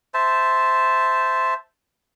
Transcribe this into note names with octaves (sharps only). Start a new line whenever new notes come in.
C5 E5 A5